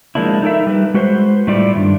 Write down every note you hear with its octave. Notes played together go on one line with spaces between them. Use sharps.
F3 G#3 A#3 D4 E4
D#4 A4 A#4 E5
G3 B4
G#3 F#4 B4 C5
A2 G3 A3 E4 F4 D5
G2 D#3 D4